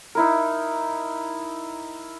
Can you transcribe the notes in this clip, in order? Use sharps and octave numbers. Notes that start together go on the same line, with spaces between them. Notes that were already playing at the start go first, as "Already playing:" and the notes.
D#4 E4 A#4